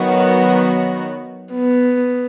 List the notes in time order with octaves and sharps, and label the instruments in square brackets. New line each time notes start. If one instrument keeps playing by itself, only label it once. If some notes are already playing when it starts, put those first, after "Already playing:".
Already playing: [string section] D#3 F#3 B3 F#4
[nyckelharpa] B3